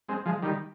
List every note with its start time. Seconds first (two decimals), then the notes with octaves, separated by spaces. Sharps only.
0.09 G#3 C4
0.26 F3 G#3
0.42 D#3 G3